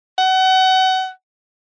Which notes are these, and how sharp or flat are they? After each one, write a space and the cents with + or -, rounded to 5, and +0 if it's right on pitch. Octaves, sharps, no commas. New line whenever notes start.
F#5 +30